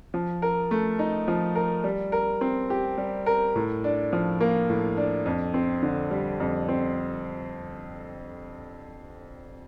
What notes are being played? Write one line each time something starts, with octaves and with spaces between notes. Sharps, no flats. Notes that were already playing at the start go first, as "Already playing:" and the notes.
F3
A#4
A3
D#4
F3
A#4
G3
A#4
C4
G4
G3
A#4
A2
D4
F3
A#3
A2
D4
F2
C4
D3
G3
F2
C4